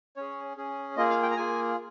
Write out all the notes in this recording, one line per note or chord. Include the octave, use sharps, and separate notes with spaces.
C#4 G#4 C#5
C#4 G#4
A#3 F4 G#4 D#5
F5
G5
A#5
A#3 F4 G#4 G#5